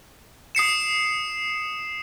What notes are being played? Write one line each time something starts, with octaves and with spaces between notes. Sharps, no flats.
D#6 C7 C#7 E7